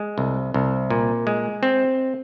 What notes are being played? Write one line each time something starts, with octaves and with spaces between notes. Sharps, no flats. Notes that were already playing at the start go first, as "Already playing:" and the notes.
Already playing: G#3
C2
C2
A#2
G#3
C4